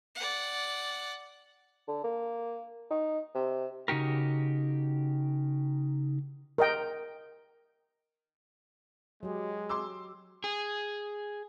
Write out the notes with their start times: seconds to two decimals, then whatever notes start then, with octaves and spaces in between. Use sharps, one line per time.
0.15 D5 F#5
1.88 D3
2.04 A#3
2.90 D#4
3.35 C3
3.88 C#3 D#4 F#4 G4 A#4
6.58 A#4 D#5 G5
9.23 F#3 G#3 G4
9.69 C6 D6 E6
10.44 G#4